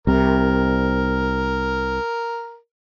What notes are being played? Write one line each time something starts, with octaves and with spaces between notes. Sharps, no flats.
C2 C3 A#4